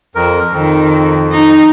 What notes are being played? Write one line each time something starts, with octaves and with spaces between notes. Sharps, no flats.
F2 A#4
F2 D#3
D#4